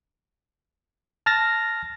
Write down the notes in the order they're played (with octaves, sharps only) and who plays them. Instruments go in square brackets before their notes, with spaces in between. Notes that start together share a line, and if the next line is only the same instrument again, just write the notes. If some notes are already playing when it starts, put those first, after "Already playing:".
[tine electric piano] A5 F6 A6 A#6